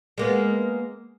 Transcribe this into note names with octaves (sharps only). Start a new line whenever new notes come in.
G#3 A#3 B3